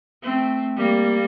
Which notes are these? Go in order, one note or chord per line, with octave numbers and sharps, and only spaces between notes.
A3 C4
G3 A#3